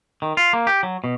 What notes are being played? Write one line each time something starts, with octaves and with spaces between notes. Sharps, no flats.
D#3
F4
A#3
G4
F#3
B2